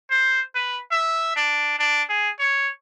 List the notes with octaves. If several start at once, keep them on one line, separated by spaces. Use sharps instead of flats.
C5
B4
E5
D4
D4
G#4
C#5